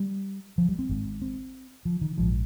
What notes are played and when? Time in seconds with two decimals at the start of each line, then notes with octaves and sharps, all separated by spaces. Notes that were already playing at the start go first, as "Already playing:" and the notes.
Already playing: G3
0.58 F3
0.69 G3
0.79 C4
0.89 G#1 G#2
1.22 C4
1.85 F3
2.01 D#3
2.17 A#1 G#2 F3